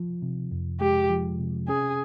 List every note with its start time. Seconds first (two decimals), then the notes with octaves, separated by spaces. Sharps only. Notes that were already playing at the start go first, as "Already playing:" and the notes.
Already playing: F3
0.22 C3
0.51 F2
0.81 G#3 G4
1.10 F3
1.39 C3
1.68 C#4 G#4